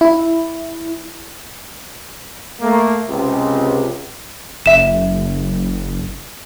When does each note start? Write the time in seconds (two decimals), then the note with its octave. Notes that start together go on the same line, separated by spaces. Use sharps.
0.01 E4
2.61 A3 A#3
3.09 C#2 C3
4.66 F#1 E5 E7